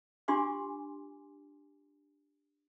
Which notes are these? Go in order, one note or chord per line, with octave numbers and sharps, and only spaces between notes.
D4 F4 G4 G#5 C6 D6